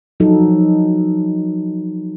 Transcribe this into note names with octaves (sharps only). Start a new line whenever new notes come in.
F3 F#3 D#4 F#4 A4